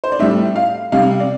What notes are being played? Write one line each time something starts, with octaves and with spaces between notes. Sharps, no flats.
C5
D5
A2 G3 E5
F5
C3 G3 F5
D5